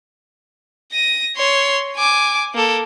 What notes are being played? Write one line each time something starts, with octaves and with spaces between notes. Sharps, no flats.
A#6 D#7
C#5 C6
G#5 D6
A#3 A4